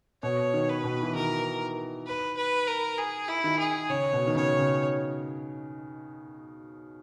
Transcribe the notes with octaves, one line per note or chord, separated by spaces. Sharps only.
B2 C#5
D#3
B4
B2
E3
D#3 A#4
B4
B4
A#4
G#4
E4
D#3
G#4
C#3 C#5
B2
D#3
C#3 C#5
C#3